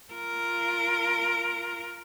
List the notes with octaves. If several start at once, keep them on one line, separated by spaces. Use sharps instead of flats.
F4 A#4